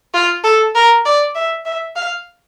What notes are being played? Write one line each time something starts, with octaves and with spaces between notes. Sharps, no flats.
F4
A4
A#4
D5
E5
E5
F5